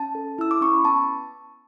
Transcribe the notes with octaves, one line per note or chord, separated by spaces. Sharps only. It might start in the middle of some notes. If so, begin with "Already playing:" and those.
Already playing: C#4 A5
A4
E4 E6
D6
C#4 C#6
B5
B3 A5